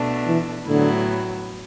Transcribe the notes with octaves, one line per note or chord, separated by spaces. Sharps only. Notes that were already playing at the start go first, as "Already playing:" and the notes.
Already playing: B2 A3 D4
E3
A2 D3 F#3 B3 E4